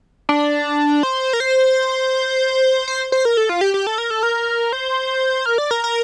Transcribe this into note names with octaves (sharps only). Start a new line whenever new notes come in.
D4
C5
A#4
C5
C5
C5
A#4
A4
F4
G4
G4
A4
A#4
A4
A#4
C5
A#4
D5
A#4
A#4